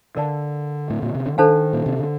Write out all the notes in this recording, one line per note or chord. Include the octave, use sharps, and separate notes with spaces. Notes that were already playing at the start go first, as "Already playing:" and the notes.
D3 A#4 D5 F5 A5
A2
A#2
C3
D3
D#3 D4 A4 C5 F5 A5
A#2
C3
D3